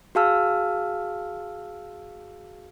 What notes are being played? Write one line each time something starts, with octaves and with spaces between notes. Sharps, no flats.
F#4 G#4 F5 A5 E6 F6